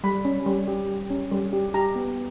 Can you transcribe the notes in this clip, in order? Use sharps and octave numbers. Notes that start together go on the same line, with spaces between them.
G3 B5
C#4
G3
G4
G3
C#4
G3
G4
G4 A#5
B3